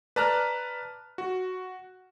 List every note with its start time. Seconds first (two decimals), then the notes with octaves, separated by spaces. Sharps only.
0.16 B4 D5 A5 A#5 F6 F#6
1.18 F#4